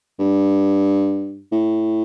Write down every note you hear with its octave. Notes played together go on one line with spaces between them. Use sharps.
G2
A2